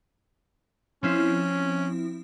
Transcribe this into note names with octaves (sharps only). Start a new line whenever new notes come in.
F3 C4 C#4 E4